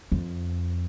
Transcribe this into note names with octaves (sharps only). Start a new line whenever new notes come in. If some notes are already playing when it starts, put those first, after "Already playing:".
F2